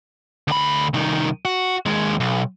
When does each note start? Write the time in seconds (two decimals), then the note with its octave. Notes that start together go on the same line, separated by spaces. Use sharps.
0.48 D2 B5
0.94 C2 D#3
1.45 F#4
1.86 D#2 G#3
2.20 B1